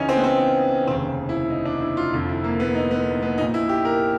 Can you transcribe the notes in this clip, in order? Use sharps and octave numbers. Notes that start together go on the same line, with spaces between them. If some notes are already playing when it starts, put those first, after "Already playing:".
Already playing: C#2 C#3 E3 C#4 D#4
C4
B3
C4
F1 D#2 C#3 C4
E4
D#4
D4
E4
F4
F1 F2 D3
E4
A#3
B3
D#4
B3
B3
A#1 A#2 D#4
E4
G4
A#4